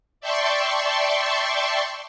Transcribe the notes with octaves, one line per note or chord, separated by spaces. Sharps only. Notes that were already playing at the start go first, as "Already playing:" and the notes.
D5 E5 G5 A5 C6 C#6